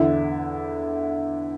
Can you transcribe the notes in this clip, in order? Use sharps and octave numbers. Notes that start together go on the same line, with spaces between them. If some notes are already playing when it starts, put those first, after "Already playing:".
Already playing: E2 D3 E4